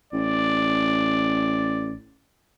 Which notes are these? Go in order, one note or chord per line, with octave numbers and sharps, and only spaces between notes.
A1 D5